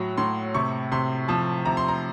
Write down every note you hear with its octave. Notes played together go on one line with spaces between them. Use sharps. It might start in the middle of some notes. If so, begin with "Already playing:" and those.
Already playing: A2 F#3
A2 C6
C3 C#6
C3 C6
F3 A5
C3 A#5
C6
A#5